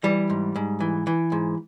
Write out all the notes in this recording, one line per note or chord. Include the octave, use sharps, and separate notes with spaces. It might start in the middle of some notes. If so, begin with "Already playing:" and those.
E3 G3
G#2
G#2
E3
E3
G#2